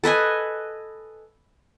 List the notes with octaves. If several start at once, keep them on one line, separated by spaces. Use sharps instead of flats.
A4 B4 D#5 G#5